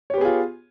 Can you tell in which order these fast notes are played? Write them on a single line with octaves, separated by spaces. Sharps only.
C#5 G4 B3 G#4 F4